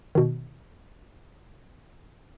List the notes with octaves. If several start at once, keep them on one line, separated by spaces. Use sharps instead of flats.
B2 D#3